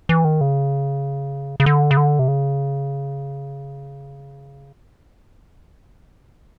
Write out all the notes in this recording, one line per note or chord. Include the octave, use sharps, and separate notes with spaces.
E3
D#3
C#3
C#3
D3
C#3
D3
C3
C#3